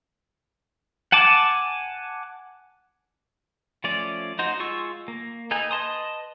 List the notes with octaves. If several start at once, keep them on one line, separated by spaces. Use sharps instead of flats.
F#5 G#5 A5 D6
F3 A3 C#4 D5
D#4 F#4 C5
G#3 F4 C#6 E6
A#3
D#4 A4 B4 G#5
B4 D#5 A5 C6 D#6